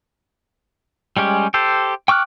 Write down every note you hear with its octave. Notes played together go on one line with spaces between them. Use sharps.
G3 G#3 C#4 G4
G4 A4 C5
G5 C#6 D6 F6 F#6